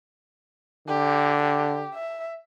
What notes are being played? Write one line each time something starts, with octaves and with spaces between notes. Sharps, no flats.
D3 G4
G4
E5